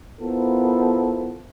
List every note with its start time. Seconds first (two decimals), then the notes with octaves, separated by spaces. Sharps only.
0.21 B3 E4 F4 A4 A#4 C5